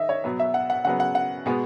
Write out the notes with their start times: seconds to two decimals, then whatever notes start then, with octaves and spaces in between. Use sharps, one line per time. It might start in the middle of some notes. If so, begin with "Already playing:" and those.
Already playing: D#3 D#5 E5
0.09 C#5
0.24 B2 F#3 B3
0.39 E5
0.54 F#5
0.70 F#5
0.85 C#3 F#3 B3 F#5
1.00 F#5
1.15 F#5
1.46 B2 G#3 B3